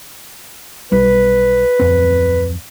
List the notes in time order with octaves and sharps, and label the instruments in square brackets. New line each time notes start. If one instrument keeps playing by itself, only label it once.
[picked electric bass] B1 G3 [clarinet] B4
[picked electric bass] D1 F2 C4